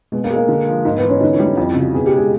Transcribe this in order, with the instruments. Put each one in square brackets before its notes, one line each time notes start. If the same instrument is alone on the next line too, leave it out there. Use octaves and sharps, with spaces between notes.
[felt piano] B2 [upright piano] G#3
[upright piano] A#3
[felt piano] G#3
[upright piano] A#3
[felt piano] D3
F3
[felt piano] G#2 [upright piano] A#3
[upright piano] B3
[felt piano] E3
[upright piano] C#4
[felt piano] D3 [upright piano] D#4
[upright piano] E4
[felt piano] G3
[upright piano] E4
[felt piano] F2 [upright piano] E4
[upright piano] E4
[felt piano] C#3
[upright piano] F#4
[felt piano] B2 [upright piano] G#4
[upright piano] G4
[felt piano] G#3
[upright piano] G#4